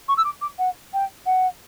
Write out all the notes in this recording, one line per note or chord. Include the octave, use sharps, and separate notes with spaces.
C#6
E6
D6
D6
F#5
G5
F#5